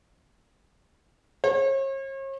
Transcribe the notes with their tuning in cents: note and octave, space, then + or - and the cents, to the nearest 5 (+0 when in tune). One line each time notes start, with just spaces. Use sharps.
C#5 -40